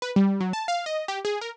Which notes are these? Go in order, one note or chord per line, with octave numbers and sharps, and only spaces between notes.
B4
G3
F#3
A5
F5
D#5
G4
G#4
A#4